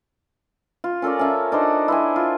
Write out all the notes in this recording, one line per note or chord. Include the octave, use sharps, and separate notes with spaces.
F4
C#4 A4 A#4 D5
C#4 E5
D4 D#4 C5
E4 C5 G#5
F4